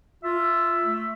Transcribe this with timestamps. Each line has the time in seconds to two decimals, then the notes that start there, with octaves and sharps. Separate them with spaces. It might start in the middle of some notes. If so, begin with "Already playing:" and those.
0.24 F4 E5
0.84 A3